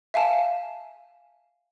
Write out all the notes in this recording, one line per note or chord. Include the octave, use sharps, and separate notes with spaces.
E5 F5 G#5 A5